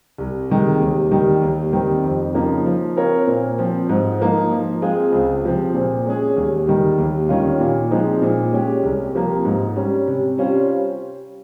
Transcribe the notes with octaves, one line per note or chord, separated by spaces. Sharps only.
C2
C3 D#3 G#3
D#2
D#3 G3
D#2
D#3 G3 C4
F2
C#3 F3 A#3 D#4
F3
C4 F4 A#4 C#5
A#2
F3 C4
G#2
F3 A#3 D#4
F3
G#3 C4 F4 G#4
C#2
C3 F3 C4
A#2
G#3 C#4 G#4
D#2
D#3 G3
D#2
D#3 G3 C#4 F4
A#2
F3 G#3 C4 D#4
A#2
G#3 C#4 G4
C2
C3 F3 A#3
G#2
G3 C#4
C3
G3 C#4 F4 C5